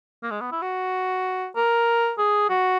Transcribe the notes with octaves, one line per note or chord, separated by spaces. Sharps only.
A#3
G#3
B3
E4
F#4
A#4
G#4
F#4